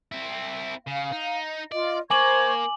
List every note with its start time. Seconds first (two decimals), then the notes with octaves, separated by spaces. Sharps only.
0.12 C4 E4
0.87 C#3 F5
1.12 D#4
1.72 F4 D5 D#5
2.10 A#3 C5 G#5 C#6 D6 G#6 F#7